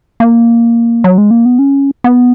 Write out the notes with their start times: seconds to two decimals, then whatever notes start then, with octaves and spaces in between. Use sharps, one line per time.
0.20 A#3
1.04 F#3
1.18 G#3
1.31 A#3
1.45 B3
1.59 C#4
2.04 B3